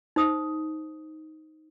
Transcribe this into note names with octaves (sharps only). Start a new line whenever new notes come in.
D#4 C5 D#6